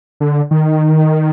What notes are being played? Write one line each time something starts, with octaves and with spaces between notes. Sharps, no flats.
D3
D#3